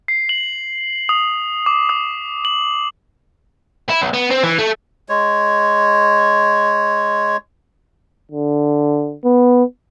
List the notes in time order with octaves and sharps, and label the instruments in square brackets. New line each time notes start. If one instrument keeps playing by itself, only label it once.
[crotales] C7
F#7
D#6
D6
D#6
F#7
[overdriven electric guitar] E4
B1
B3
C4
E3
A3
[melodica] G#3 C#5
[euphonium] D3
B3